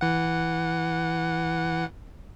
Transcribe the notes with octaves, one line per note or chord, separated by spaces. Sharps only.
E3 F#5